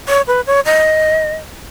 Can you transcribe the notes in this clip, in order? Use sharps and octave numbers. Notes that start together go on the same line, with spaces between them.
C#5
B4
C#5
D#5